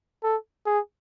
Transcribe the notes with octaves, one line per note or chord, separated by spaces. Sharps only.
A4
G#4